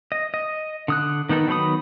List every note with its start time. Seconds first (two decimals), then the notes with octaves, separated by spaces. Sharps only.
0.12 D#5
0.34 D#5
0.88 D3 D#6 F#6
1.29 D#3 B3 D#4 A4
1.48 D#3 F#3 B3 B5 D#6